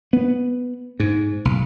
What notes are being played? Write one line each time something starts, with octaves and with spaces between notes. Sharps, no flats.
B3
G#2
B1